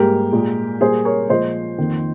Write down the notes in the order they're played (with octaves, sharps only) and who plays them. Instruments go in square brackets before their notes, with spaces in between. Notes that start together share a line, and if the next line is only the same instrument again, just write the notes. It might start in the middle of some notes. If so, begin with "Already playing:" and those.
Already playing: [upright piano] G#2 G3 A#3 G4 A#4
A#2 G#3
A#2 G3 A#3 G#4 C5
A#4 C#5
A#2 F3 G#3 C5 D#5
F2 D#3 A#3